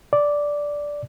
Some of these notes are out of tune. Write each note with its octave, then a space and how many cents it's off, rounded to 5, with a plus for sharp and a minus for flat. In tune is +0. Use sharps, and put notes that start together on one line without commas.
D5 -5